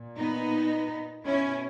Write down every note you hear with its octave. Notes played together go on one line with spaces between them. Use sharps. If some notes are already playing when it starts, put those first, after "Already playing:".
Already playing: A#2
B3 D#4
B2 C#4 E4